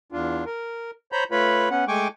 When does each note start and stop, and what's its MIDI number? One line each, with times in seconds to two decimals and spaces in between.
0.12 0.44 40
0.12 0.44 62
0.12 0.44 65
0.46 0.91 70
1.12 1.24 72
1.12 1.24 73
1.12 1.24 82
1.12 1.24 83
1.12 1.24 91
1.31 1.69 57
1.31 1.69 65
1.31 1.69 71
1.31 1.69 73
1.31 1.69 83
1.71 1.85 59
1.71 1.85 61
1.71 1.85 78
1.88 2.08 56
1.88 2.08 57
1.88 2.08 79
1.88 2.08 80
1.88 2.08 85
1.88 2.08 86